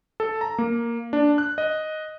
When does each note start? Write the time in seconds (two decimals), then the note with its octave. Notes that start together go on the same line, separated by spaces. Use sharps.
0.20 A4
0.41 A#5
0.58 A#3
1.13 D4
1.38 F#6
1.58 D#5